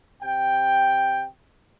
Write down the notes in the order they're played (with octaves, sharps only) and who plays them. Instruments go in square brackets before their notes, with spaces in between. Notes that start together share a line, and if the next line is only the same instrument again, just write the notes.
[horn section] C3 G5